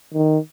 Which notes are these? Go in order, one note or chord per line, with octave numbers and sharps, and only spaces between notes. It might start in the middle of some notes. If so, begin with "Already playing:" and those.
D#3